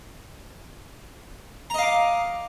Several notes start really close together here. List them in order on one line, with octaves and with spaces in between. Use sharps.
A#5 D#5 F5 D6